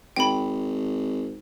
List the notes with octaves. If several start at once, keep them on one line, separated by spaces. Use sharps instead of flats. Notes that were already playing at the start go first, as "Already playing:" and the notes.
G#1 G5 B5